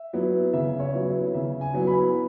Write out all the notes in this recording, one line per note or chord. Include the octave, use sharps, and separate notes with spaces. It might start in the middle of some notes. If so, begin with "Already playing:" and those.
Already playing: E5
F#3 B3 E4
C#3 E5
C#5
F#3 B3 E4
E5
C#3 E5
G#5
F#3 B3 E4
B5